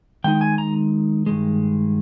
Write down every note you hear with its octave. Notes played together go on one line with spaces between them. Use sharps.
D#3 G#3 D#4 G5
G#5
A#5
G2 D#3 G#3